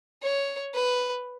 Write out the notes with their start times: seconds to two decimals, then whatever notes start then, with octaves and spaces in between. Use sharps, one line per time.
0.23 C#5
0.75 B4